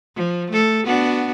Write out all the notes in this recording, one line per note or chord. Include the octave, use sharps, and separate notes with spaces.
F3
A3 A4
B3 D4 F#4